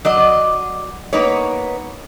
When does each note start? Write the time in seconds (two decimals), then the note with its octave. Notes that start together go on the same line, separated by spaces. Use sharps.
0.05 F#3 D5 D#5
1.13 A#3 B3 D#4 B4 C#5